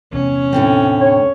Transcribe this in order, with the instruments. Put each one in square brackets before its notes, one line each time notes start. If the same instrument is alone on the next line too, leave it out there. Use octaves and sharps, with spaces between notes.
[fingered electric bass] E2 C3 [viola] C#4
[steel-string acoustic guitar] A2 D3 C4
[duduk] C#5